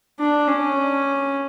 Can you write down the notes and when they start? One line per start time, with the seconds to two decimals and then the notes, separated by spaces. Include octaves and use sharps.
0.20 D4
0.48 C#4